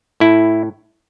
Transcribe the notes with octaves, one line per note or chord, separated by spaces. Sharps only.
A2 E4